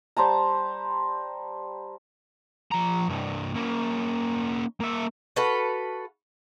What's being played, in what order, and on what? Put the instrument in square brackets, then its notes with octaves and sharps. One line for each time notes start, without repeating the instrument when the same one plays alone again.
[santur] G3 C5 A5 A#5
[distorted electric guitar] F3 A#5
C2 G2
A#3 C#4
A#3 E5
[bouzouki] F#4 A4 B4 F5